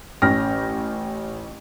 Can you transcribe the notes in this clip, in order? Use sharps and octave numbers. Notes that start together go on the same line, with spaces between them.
A1 C#4 G5 F6 A#6